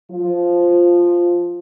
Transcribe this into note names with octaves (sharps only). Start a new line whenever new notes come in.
F3 F4